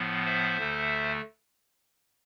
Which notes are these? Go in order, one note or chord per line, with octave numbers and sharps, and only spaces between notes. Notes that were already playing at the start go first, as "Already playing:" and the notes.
Already playing: A2 F3 B3
C5 E5
D2 D3 A3